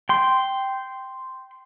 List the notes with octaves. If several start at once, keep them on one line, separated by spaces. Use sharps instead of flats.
G5 C6